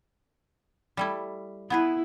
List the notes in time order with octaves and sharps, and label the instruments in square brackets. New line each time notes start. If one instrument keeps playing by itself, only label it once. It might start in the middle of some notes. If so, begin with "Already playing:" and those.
[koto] G3 A3 E4
[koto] B3 G#4 B4 [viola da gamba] E4